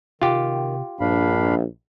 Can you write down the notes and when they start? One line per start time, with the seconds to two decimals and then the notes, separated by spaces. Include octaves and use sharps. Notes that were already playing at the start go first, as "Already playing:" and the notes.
0.22 C3 D#3 F4 G4
1.00 A#1 G2 D4 F5 B5